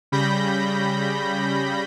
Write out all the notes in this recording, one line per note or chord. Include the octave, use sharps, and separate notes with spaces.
C#3 G3 B5 G6 A#6